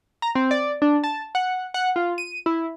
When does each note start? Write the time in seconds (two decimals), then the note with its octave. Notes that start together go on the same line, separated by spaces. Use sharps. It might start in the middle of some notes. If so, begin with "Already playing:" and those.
0.22 A#5
0.35 C4
0.51 D5
0.82 D4
1.04 A5
1.35 F#5
1.74 F#5
1.96 F4
2.18 D#7
2.46 E4